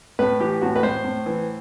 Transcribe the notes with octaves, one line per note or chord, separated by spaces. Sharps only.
A2 B4
E3 G4
A2 F#4
B4
A2 C5
A2
E3